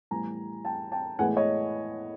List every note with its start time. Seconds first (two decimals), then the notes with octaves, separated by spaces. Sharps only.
0.11 A2 E3 G3 B3 G#5 A#5
0.65 G5 A5
0.92 G5 A5
1.19 A2 E3 G#3 B3 F#5 G#5
1.37 C#5 D#5